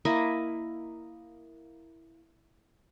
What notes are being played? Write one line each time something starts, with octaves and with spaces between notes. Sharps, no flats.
A#3 E4 D#5